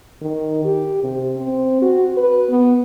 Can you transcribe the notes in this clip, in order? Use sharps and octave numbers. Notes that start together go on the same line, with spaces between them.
D#3
G4
C3
C4
F#4
B4
B3